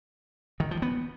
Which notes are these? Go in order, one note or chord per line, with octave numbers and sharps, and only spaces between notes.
D#3
F3
B3